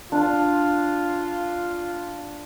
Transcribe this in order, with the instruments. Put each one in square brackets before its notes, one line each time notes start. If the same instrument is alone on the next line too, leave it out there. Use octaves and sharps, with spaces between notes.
[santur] D4 [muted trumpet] F4